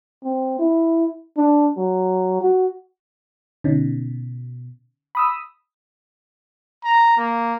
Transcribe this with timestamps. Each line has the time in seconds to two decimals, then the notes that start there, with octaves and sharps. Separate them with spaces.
0.24 C4
0.59 E4
1.37 D4
1.77 F#3
2.41 F#4
3.64 B2 D3 C#4 D#4
5.15 B5 D#6 E6
6.84 A#5
7.17 A#3